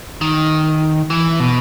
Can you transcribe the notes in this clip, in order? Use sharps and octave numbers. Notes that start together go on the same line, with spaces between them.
D#3
E3
B2